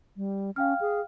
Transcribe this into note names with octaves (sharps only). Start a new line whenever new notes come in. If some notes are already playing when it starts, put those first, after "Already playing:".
G3
C#4 F5 G5 F6
G#4